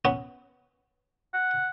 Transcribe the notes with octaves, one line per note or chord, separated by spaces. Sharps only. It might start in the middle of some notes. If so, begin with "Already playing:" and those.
B3 C#4
F#5